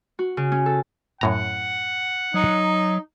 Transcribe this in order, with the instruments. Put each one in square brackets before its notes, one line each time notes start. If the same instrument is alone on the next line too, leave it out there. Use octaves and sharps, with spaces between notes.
[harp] F#4
C#3
C#4
A4
[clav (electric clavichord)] F#2 A2 A#5 [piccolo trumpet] F#5
[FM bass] F#3 [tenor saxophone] D#4